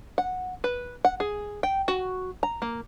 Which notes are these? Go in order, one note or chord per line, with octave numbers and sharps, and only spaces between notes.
F#5
B4
F#5
G#4
G5
F#4
A#5
A#3